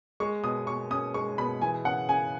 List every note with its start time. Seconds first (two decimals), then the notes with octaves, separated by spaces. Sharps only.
0.20 G#3 C#6
0.44 B2 D#6
0.67 B2 C#6
0.90 C#4 D#6
1.14 G#3 C#6
1.38 B2 B5
1.61 E3 G#5
1.85 C#3 F#5
2.09 C#3 G#5